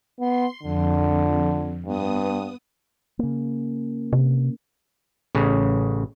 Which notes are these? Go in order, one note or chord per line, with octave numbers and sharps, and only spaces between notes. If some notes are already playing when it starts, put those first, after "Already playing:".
B3 C6
F2 D3
G2 B3 D#6
C#3 A#3
C3
A1 C#3